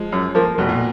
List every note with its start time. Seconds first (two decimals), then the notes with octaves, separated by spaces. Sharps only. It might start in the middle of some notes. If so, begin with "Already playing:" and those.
Already playing: F3 G#3
0.12 F#2
0.35 F3 A#3
0.58 F1 B2
0.69 A#2